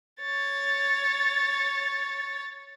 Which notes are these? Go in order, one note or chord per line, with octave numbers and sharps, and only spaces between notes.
C#5 A6